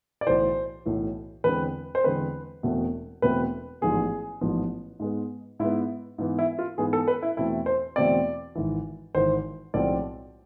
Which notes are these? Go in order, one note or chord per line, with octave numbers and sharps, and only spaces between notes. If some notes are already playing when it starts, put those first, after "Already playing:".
D5
B1 A2 E3 C5
B1 A2 E3
E2 D3 G#3 C4 B4
C5
E2 D3 G#3 C4 B4
E1 E2 B2 A3 C4
E1 E2 B2 A3 C4 B4
A1 G#2 F3 B3 G#4
A1 G#2 F3 B3
G#2 G#3 B3
G#2 G#3 B3 E4
G#2 E3 B3
E4
F4
G#2 E3 B3 G#4
A4
B4
E4
E2 B2 A3 C4 E4
C5
E2 B2 A3 C4 D5
G#1 G#2 E3
G#1 G#2 E3 C5
B1 A2 F3 G#3 C4 D5